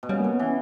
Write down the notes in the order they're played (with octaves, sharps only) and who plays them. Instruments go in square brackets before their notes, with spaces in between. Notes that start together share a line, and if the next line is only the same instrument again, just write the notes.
[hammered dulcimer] B2
[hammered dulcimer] C#3 [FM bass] G3
[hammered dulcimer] B2 [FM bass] A#3
[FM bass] B3
[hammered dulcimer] E3 [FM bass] C#4